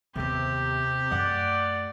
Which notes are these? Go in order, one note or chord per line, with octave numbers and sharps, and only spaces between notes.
D#2 C3 B3 G4
F#2 A3 D5 F#5